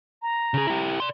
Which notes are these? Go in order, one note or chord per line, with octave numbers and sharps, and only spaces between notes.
A#5
C#3 G#4
E4 G4
D5 C6